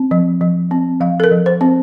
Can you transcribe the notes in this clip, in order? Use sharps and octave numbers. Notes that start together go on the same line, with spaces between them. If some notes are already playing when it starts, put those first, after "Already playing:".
Already playing: C4
F3
F3
C4
F3 F5
A4
A#4
F3
C5
C4